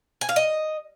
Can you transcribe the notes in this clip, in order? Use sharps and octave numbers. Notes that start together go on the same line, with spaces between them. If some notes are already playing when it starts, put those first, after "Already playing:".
G#5
F5
D#5